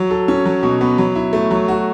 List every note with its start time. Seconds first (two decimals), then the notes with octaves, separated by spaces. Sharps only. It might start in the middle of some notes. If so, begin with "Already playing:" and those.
Already playing: F#3
0.11 A4
0.28 C#4
0.45 F#3
0.63 B2
0.81 B3
0.98 F#3
1.15 E4
1.33 A3
1.51 F#3
1.68 F#4